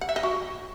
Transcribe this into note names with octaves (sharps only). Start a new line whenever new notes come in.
F#5
E5
D#5
F#4